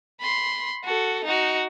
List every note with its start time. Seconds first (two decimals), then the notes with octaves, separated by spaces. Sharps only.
0.21 B5 C6
0.84 F#4 A4
1.25 D#4 F#4